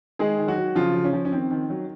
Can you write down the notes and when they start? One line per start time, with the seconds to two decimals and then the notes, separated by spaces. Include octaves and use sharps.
0.19 D#3 G#3 G#4
0.38 D#3
0.48 F#3 F#4
0.58 F#3
0.75 C#3 F3 F4
0.94 C#3
1.04 C#4
1.13 F3
1.25 C#4
1.32 D#3 C4
1.51 D#3
1.70 F#3